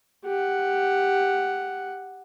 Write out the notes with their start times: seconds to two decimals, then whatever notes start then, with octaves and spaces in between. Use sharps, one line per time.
0.25 G4 F#5